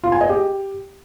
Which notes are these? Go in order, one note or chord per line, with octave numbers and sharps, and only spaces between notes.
F4
G#5
D#5
G4